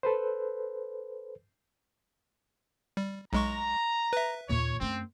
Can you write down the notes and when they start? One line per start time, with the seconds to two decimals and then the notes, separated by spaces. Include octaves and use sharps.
0.03 A4 B4 C5
2.97 G3
3.33 B1 G#3 A#5 C#6
4.13 B4 E5
4.49 D#2 A#2 C#5
4.81 F#2 A3 C4